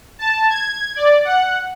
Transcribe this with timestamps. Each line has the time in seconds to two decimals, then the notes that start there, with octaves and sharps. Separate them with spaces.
0.19 A5
0.50 G#6
0.96 D5
1.25 F#5